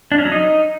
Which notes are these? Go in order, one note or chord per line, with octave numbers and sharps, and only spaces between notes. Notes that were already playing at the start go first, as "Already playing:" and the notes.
D4
C#4
F#3
D#4